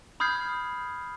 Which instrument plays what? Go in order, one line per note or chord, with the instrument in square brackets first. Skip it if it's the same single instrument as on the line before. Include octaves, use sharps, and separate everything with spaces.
[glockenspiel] B5 D#6 F6 G6 G#6 C7